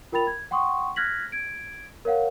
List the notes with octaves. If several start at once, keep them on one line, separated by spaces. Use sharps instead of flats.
F4 A#4 G5 B5 A6 F7
G#6
F#5 G5 C6 C#6 D#6
F6 F#6 G#6 A#6 B6 F#7
G#6 D7
A#4 C#5 F5 F#5